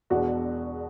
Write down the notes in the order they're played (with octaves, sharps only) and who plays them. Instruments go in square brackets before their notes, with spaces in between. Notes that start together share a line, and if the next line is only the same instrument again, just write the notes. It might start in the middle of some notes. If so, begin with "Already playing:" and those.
[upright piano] E1 E2 B2 D4 F#4